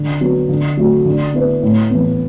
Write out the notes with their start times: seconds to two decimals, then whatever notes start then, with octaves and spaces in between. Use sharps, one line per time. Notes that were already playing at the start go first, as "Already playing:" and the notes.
Already playing: D3
0.21 F#3 B3
0.49 D3
0.77 F#3 A3 F#4
1.05 D3
1.34 B3 E4 B4
1.62 A2
1.90 E3 B3